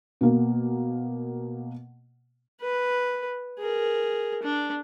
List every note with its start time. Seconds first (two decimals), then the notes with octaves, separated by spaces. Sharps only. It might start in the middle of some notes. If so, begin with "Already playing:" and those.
0.21 B2 A#3
2.61 B4
3.59 G#4 A#4
4.42 D4